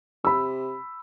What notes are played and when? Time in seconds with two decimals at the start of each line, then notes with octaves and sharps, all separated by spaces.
0.25 C3 B5 E6